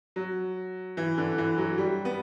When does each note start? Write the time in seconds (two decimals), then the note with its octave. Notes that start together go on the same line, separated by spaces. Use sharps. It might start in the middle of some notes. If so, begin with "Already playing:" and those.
0.16 F#3
0.97 E3
1.18 D3
1.38 E3
1.58 F#3
1.78 G3
2.05 B3